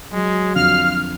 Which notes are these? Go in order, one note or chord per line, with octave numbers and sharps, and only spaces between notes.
F#3 G#3
F2 D3 F5 F6